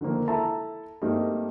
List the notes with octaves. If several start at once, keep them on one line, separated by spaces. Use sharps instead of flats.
D3 D#3 F3 A#3
E4 A4 A5 A#5
G2 A3 A#3 C4 D#4